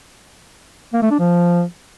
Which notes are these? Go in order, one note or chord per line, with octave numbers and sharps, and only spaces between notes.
A#3
A3
D4
F3